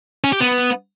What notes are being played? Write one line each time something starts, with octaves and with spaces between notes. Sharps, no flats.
C#4
G4
B3